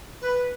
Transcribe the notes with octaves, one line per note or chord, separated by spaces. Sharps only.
B4